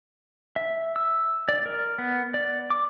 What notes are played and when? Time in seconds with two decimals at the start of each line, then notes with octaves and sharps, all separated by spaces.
0.56 E5
0.96 E6
1.49 D5
1.66 A#4
1.98 B3
2.34 D5
2.70 D6